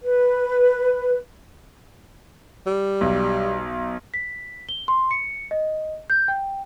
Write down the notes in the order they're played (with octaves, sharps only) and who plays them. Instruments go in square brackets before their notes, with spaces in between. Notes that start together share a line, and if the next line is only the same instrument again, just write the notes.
[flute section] B4
[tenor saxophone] G3
[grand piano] B1
[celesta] B6
G7
C6
C#7
D#5
G6
G5